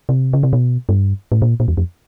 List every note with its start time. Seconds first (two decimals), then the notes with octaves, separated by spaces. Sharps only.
0.09 C3
0.33 C#3
0.43 C3
0.53 B2
0.89 G2
1.32 A2
1.42 A#2
1.60 A#2
1.68 E2
1.77 F2